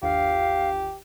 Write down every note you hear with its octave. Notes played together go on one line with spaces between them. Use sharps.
G1 D#2 G4 F5